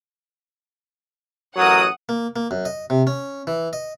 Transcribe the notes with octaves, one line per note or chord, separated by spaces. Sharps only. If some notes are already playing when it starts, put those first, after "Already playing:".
A1 F#3 A#4 F#5 D#6
A#3
A#3
F#2
D#5
C3
C#4
E3
D#5